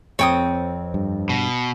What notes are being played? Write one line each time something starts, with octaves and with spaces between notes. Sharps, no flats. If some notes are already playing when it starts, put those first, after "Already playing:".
F2 C4 C#5 G5 D#6
G2
B2